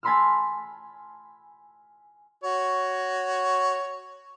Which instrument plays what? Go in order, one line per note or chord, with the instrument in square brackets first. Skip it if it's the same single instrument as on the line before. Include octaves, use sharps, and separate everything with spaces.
[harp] G#5 A5 B5 C6 E6 F6
[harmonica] F#4 C#5